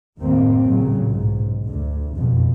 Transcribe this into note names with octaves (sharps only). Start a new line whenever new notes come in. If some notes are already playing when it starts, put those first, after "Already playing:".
F#1 D#2 A2 D#3 A#3 C4
A1 A#2 C#3 F#3
B1 G#2
D2
F#1 F2 B2